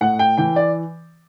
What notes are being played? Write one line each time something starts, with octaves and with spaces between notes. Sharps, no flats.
A2 F#5
G5
E3 G5
D5